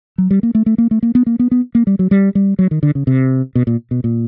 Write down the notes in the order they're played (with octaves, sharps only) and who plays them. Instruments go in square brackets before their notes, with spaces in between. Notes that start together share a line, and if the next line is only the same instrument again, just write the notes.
[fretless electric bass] F#3
G3
A#3
A3
A3
A#3
A3
A#3
B3
A#3
B3
B3
A#3
G3
F#3
G3
G3
F#3
D#3
D3
C#3
C3
B2
A#2
B2
A#2